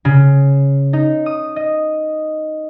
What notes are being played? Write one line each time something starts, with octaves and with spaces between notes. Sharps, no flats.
C#3
D#4
D#6
D#5